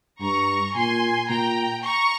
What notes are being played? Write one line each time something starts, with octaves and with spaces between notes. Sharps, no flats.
G2 A#5 C#6
A#2 G#5 C6
A#2 G5 A#5
A#5 C#6